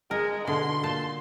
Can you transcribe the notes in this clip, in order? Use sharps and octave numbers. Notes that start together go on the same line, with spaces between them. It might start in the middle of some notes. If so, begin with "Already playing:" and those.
G#3 A#4
B2 D3 C6
A#2 A5